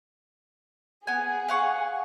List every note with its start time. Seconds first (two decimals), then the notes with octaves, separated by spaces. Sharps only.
1.07 B3 G#4 G#5
1.48 F5 F#5 C#6